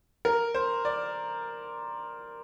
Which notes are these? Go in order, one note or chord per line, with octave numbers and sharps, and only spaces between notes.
A#4
C5
D5